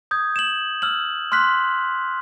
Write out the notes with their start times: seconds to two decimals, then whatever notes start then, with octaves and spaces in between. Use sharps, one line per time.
0.11 D#6 G6 G#6
0.36 E7 F#7
0.82 E6 F6 F#7
1.32 C6 F6 F#6 B6